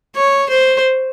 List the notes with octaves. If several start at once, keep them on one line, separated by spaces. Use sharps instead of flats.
C#5
C5